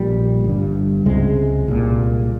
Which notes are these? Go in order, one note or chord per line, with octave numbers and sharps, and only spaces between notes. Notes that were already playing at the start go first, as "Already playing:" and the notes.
Already playing: A#1 A#2 G3
G1 G2
C#2 C3 G#3
C2 A#2